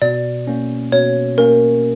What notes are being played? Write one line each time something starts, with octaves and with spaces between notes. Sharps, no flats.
B2 D5
A#3 C#4
B2 C#5
A#3 C#4 A#4